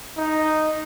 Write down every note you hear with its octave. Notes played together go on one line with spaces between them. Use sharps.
D#4